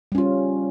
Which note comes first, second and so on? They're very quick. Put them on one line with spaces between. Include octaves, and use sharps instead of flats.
G3 C#4 F4